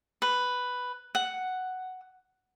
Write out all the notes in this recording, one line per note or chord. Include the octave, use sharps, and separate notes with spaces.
B4
F#5